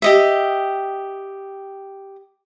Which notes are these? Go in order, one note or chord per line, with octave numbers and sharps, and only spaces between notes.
G4 D#5 E5